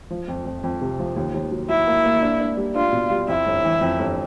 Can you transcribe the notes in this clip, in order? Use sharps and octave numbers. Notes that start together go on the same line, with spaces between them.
F3
F2
F2
F2
C3
F3
D#2
D#2
F#3
F#3 E4
A#3
A#3
D4
D4
G3
D4 F4
B2
G3
F2 E4
G1
E3
F2
G1